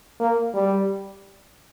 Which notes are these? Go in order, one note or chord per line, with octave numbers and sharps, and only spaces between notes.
A#3
G3